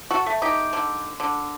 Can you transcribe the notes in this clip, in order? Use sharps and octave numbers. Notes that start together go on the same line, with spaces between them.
F#4 A4
A3
D#4 G4
D3
D3